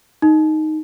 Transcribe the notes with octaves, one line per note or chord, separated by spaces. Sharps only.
D#4